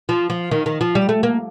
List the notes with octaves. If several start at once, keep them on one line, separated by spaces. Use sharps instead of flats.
F3
F3
D#3
D#3
F3
G3
A3
A#3